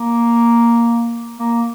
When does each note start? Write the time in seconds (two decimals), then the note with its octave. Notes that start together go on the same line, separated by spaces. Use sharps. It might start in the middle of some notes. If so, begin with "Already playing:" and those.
Already playing: A#3
1.39 A#3